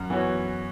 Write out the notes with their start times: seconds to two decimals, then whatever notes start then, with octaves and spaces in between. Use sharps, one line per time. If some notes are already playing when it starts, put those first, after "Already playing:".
Already playing: F#2
0.10 E3 B3 F#4 C#5